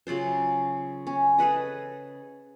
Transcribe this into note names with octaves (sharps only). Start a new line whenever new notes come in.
C#3 F#3 F4 C5
C#4
G#4 A4 B4 D#5